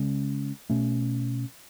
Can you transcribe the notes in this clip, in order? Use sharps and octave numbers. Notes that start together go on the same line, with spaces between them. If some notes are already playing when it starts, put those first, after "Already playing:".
Already playing: C#3 G#3 C#4
B2 A3 C#4